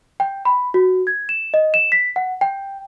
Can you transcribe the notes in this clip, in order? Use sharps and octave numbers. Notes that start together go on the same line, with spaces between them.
G5
B5
F#4
G#6
E7
D#5
E7
B6
F#5
G5